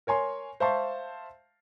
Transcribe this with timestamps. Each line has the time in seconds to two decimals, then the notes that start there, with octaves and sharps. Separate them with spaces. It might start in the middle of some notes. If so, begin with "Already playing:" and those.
0.07 A#4 C#5 G#5 C6
0.60 C5 E5 F5 A5 C6 C#6